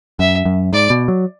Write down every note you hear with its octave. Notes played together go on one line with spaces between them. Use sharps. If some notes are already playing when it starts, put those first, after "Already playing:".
F#2 E5
F#2
G#2 D5
B2
F#3